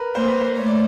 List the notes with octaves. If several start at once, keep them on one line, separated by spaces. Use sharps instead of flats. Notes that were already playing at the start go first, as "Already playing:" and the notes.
Already playing: A#4 B4
A#3 C5
B4
C5
A3 C#5
D5